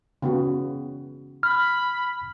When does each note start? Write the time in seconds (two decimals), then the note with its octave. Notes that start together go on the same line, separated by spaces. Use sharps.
0.22 C#3 B3 F#4
1.43 B5 F6